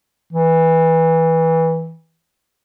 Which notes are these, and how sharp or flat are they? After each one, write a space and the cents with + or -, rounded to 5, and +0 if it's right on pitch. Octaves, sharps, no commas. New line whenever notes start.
E3 -15